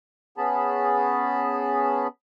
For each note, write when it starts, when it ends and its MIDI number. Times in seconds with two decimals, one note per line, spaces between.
0.38 2.07 59
0.38 2.07 61
0.38 2.07 68
0.38 2.07 81
0.38 2.07 83